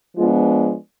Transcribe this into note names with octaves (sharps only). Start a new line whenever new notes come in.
F3 G#3 B3 D4 F4